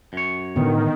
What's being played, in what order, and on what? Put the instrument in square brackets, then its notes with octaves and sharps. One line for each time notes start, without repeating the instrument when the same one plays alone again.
[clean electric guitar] F#2 C#5
[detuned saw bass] A2 [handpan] D3 B3 [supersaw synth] D#3